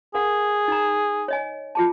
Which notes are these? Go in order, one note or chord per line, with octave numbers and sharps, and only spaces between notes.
G#4 A#4 F#5
D#4 A#5
C#5 D#5 G#5
F4 G#4 A5